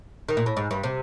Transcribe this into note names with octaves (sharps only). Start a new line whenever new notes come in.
D#3
A#2
A2
G#2
G2
C3